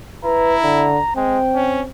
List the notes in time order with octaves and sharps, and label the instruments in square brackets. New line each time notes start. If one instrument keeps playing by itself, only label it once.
[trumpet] E4 [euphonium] B4 [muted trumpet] A#5
[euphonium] D3
[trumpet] G#3 [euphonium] C4 [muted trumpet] G5
[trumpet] C#4